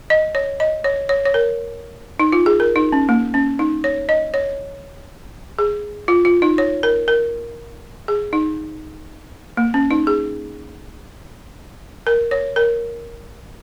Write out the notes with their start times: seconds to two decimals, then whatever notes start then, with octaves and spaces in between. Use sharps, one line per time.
0.10 D#5
0.35 C#5
0.60 D#5
0.84 C#5
1.09 C#5
1.25 C#5
1.34 A#4
2.20 D#4
2.32 F4
2.46 G#4
2.60 A#4
2.76 D#4
2.92 C#4
3.09 A#3
3.34 C#4
3.59 D#4
3.84 C#5
4.09 D#5
4.34 C#5
5.59 G#4
6.08 F4
6.25 F4
6.42 D#4
6.58 C#5
6.83 A#4
7.08 A#4
8.08 G#4
8.33 D#4
9.57 A#3
9.74 C#4
9.91 D#4
10.07 G#4
12.07 A#4
12.31 C#5
12.56 A#4